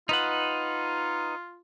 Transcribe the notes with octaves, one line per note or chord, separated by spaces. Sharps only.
D#4 F4 B4 F#5